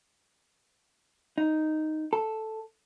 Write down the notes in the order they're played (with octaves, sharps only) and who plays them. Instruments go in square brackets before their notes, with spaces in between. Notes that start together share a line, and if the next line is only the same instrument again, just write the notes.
[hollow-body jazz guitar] D#4
A4